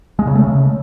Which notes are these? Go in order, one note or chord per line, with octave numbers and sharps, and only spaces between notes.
G#3
C#3
A3
C#3